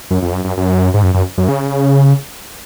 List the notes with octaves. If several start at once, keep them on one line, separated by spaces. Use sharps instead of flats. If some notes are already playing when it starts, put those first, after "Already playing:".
F#2
F2
F#2
F#2
F#2
G#2
F#2
F#2
F#2
C#3